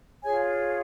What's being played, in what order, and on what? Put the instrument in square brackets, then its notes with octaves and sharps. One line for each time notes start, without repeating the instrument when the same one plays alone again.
[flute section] F4 G#4 C#5 G#5